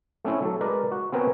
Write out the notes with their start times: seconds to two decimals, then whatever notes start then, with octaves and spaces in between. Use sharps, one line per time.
0.25 A3 C4 C#4 E4
0.42 F#3 A4
0.61 G#3 A#4 B4 D5
0.91 F#4
1.12 B3 C4 A#4 B4 C#5 G#5